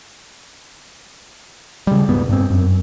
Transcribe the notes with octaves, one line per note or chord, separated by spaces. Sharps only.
C#3 G3
D#1 G#2 B3
G2 C4
F#2